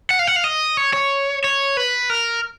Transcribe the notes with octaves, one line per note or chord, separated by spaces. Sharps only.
F#5
F5
F#5
F5
D#5
C#5
C#5
C#5
B4
A#4